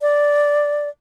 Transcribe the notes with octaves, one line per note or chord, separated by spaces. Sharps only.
D5